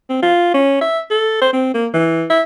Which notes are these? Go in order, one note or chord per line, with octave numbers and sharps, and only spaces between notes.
C4
F4
C#4
E5
A4
C5
C4
A#3
E3
E5